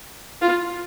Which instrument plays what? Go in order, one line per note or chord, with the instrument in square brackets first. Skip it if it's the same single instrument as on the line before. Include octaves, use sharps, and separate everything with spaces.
[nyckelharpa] F4